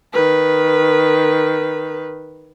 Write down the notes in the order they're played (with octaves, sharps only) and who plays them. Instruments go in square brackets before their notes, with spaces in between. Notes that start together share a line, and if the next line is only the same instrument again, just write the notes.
[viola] D#3 B4